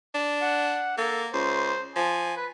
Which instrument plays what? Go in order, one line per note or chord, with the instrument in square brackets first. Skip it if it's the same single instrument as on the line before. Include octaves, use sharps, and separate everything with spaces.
[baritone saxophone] D4
[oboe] F#5
[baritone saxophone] A#3 [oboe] A4
[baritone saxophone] C#2 [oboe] C5
[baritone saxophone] F3 [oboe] G#5
[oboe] B4